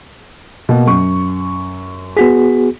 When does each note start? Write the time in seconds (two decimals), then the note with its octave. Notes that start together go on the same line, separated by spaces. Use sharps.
0.69 B2 A#3
0.87 F#2 C#6
2.17 B3 F#4 G#4 B6